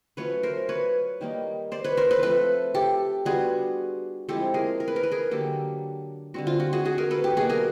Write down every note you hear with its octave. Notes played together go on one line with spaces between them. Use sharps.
F#3 A3 C#4 F4 B4 C#5
A#4 C5
B4 C#5
D#3 G3 A#3 D#4
C5 D5
B4 C#5
A#4 C5
A4 B4
F3 A3 C4 A4 B4
G4 A4
G3 B3 D4 F4 F#4 G#4
F3 G#3 C4 E4 G4 A4
G#4 A#4
A#4
B4
A#4
B4
G#4 A#4
D3 F#3 A#3 G4 A4
D3 G3 C4 F#4
F4
F#4
F#4 G#4
F#4 G#4
G#4 A#4
A4 B4
G4 A4
B2 F#3 A#3 F#4 G#4
G#4 A#4